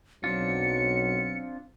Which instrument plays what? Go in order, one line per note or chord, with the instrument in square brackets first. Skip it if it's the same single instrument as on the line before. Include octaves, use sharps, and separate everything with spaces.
[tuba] B1 [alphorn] F#3 [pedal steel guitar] C4 D4 F4 [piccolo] C#7